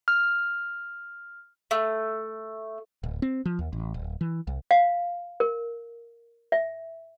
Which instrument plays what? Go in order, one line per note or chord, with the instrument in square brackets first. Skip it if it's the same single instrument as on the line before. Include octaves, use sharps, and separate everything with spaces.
[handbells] F6
[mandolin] A3
[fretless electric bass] D1
C4
F3
D#2
A1
D1
E3
C2
[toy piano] F5
A#4
E5